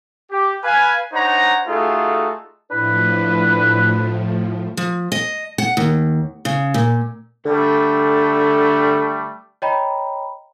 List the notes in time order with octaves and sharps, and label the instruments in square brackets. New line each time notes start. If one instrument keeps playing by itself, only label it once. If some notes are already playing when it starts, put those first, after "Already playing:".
[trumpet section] G4
B4 F5 G#5
D4 D#4 C5 C#5 F#5 A#5
A3 D#4 F4 F#4 G#4 A4
[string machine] A2 F3 [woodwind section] D4 E4 B4
[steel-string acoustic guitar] F3
D#5
F#5
D#2
C#3
A#2
[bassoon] D3 [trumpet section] G3 A3
[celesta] C#5 D#5 G5 A#5 B5